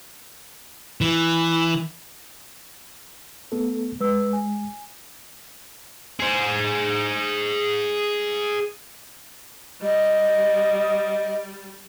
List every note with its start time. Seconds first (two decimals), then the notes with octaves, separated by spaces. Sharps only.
1.01 E3
3.52 A3 B3 A4
4.01 G#3 B4 E6
4.33 G#5
6.20 G#4 C5
9.82 G3 D#5